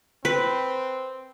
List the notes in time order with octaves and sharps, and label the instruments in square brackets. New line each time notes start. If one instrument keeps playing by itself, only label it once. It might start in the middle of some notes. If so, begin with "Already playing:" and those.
[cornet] C4 [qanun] B4